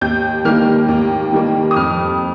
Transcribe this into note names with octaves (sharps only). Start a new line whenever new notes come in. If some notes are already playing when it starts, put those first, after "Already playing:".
D#2 G6
D#3 G3 A#3 F6
D#2
D#3 G3 A#3
D#6
F2 F6